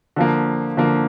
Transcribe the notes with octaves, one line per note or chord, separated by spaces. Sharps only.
D3 F3 A#3
D3 F3 A#3